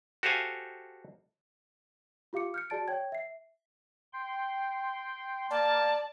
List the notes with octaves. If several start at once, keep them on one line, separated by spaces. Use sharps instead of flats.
F#4 G4 A4 C5 F5 G#5
F4 G4 F5 D6 C#7
F6 G6 C#7
F#4 G#4 D5 A5 A6 D7
C#5 G5 G#6
E5 C7
G5 C6
A#3 D5 A5